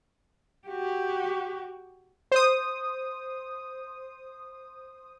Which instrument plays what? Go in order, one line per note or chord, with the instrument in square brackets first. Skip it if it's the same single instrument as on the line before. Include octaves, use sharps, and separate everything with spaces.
[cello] F#4 G4
[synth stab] C5 D#6